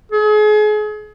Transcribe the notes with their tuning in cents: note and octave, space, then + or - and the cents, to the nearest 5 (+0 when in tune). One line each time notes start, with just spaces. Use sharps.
G#4 +35